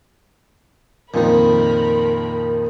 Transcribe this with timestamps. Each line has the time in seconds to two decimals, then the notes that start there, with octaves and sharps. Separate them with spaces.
1.14 F2 A#2 D#3 F3 D#4 A#4 B5